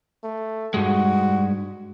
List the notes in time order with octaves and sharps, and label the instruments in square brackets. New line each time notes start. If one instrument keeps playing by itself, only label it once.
[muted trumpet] A3
[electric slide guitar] G2 G#3 [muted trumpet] F#4